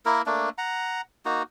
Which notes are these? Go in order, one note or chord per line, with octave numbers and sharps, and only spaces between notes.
A#3 E4 A#4
A3 A#3 D4
F#5 A#5
A#3 D#4 F#4